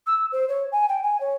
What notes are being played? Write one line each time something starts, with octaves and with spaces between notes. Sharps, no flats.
E6
C5
C#5
G#5
G5
G#5
C#5